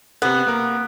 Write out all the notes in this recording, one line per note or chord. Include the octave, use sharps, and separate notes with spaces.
C3 B3 F#6
A#3 A#4